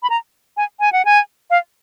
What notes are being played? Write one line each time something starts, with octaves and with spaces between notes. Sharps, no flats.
B5
A#5
G#5
G#5
F#5
G#5
F5